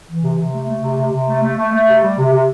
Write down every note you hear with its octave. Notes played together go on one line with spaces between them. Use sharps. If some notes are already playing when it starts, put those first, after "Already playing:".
E3
C3
C3
A3
A3
C3
C3
C3
A3
A3
A3
A3
C3
G3
C3
C3